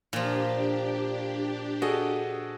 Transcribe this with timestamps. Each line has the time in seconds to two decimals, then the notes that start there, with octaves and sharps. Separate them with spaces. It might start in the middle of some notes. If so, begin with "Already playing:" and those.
0.13 A#2 F3 D4 G4
1.82 F#4 G#4 A4 D#5